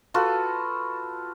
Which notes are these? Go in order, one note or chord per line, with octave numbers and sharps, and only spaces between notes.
F4 F#4 A4 B4